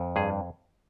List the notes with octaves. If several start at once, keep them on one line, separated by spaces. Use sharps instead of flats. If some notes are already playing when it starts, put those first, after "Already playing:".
Already playing: F2
G2 G#4